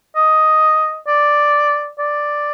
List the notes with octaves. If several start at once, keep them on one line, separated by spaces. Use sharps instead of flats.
D#5
D5
D5